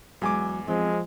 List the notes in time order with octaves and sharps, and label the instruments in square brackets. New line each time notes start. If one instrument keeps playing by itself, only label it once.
[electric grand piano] E2 G#5 D6 [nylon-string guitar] F#3 G#3
[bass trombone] F3 [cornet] G#3 [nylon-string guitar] C4